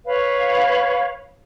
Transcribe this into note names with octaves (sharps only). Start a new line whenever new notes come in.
B4 C#5 F5